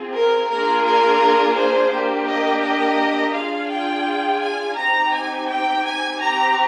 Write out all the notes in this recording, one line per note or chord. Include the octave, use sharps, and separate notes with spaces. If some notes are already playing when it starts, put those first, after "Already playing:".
Already playing: C4 F4 G#4
A#4
A#3 D4 F4 G#4 A#4
A#4
C5
A#3 D4 G4
D#5
D#5
D4 F4 G#4 F5
G5
G#5
C4 D#4 G4 A#5
G#5
G5
G#5
C4 G4 A#5